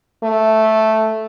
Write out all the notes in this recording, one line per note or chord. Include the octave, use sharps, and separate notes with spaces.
A3